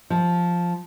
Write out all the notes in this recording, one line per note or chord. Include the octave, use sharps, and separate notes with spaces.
F3